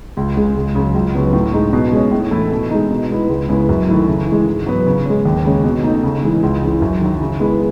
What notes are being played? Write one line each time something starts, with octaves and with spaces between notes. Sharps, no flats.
C#2
C#3 G#3
C#2
C#3 F#3
C#2
C#3 F#3 B3
A2
G#3 D#4
B2
G#3 C#4
A2
E3 A3 E4
B2
G#3 D#4
B2
G#3 B3 E4
C#2
C#3 G#3 B3 E4
F#2
D#3 A3 E4
C#3
E3
G#3
G#2
F#3 B3
C#3
G#3 C#4
D#2
C#3 G#3 C#4
B2
A3 D#4
C#3
E3 G#3
C#2
C#3 E3
F#2
D#3 F#3
C#3
G#3 B3 E4